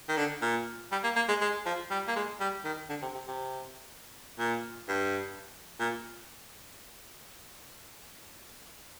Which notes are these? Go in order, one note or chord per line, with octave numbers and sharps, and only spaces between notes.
D#3
D3
A#2
G3
A#3
A#3
G#3
G#3
F3
G3
A#3
G#3
G3
D#3
D3
C3
C3
C3
A#2
G2
A#2